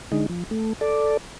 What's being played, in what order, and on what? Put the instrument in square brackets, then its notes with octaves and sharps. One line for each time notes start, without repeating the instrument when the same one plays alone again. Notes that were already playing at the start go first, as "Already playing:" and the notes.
[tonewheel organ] D3 G#3 D#4
F3
A3
A4 D5